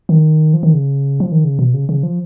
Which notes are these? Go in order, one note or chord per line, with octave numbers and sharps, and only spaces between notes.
D#3
F3
D#3
C#3
F3
D#3
C#3
B2
C#3
C#3
F3